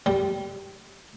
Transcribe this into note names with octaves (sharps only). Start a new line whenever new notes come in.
G3